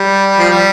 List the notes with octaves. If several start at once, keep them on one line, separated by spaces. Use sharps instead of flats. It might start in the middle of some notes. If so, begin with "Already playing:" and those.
Already playing: G3
F3
G3